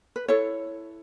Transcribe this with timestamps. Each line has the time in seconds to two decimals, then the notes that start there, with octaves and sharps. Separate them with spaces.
0.16 B4
0.28 E4 A4 C#5